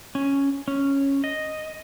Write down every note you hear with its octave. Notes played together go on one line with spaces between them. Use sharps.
C#4
C#4
D#5